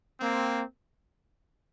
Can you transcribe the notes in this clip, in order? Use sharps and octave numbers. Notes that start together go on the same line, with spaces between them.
A#3 C4